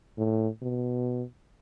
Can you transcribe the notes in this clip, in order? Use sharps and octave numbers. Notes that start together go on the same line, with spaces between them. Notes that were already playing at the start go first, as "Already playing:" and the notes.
A2
B2